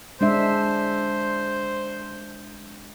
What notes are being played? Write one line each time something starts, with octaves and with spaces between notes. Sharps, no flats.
G#3 D4 C5 E5